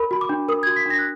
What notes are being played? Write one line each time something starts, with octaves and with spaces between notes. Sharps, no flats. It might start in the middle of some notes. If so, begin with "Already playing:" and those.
Already playing: A#4 B5
F#4 B5
D6
D4
A#4 D#6
F#4 G#6
B6
D4 A#6
F#6